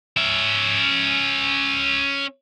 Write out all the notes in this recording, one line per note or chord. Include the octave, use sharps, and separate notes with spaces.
C#4 E5